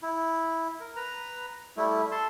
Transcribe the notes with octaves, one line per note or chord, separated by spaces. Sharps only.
E4
A#4
B4 A#5
G3 A3 E4
A4 A5 C6